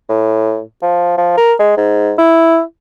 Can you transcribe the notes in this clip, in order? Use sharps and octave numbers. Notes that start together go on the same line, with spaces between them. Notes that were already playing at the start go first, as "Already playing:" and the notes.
A2
F3
F3
A#4
G#3
G#2
E4